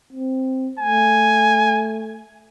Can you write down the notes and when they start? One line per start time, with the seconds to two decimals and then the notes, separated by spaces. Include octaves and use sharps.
0.13 C4
0.79 A3 G#5